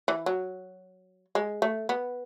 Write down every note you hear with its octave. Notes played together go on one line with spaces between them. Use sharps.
E3
F#3
G#3
A3
B3